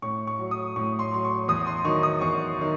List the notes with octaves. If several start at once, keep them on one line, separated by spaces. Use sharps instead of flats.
A2 C#6
C#6
F#3
D#6
A2 C#6
C6
F#3 C6
C#6
E2 D#6
C6
D#3 F#3 C#6
D#6
E2 C#6
D#3 F#3